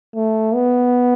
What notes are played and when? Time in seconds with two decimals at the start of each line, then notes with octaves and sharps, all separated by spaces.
0.15 A3
0.55 B3